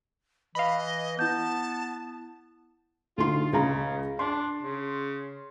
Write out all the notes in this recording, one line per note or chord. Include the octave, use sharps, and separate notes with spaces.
E3 D#5 F5 B5
B3 E4 A5 G6
D2 D#4 F4 C6
C#2 C#3 F5 A#5
D4 C6
C#3